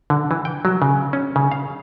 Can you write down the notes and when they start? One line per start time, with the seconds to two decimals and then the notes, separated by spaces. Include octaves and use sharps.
0.10 D3
0.31 E3
0.45 G5
0.65 F#3
0.82 C#3
1.13 C#4
1.36 C#3
1.52 F5